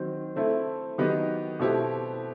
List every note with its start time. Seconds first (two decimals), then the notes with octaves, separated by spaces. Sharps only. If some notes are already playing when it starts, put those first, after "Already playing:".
Already playing: D#3 F#3 C4
0.36 A3 C4 E4 A4
0.98 D#3 F#3 B3 D#4 G4
1.59 B2 A3 C4 E4 G4